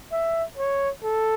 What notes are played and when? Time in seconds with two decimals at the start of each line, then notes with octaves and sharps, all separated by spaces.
0.12 E5
0.58 C#5
1.03 A4